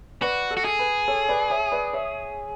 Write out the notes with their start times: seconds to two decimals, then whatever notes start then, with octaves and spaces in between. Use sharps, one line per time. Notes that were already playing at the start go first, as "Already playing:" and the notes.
0.22 F#4 B4 D5
0.51 A4
0.57 F#4
0.65 G#4
0.79 B4
1.08 A4 C#5
1.29 B4 D5
1.50 C#5 E5
1.72 B4 D5
1.93 C#5 E5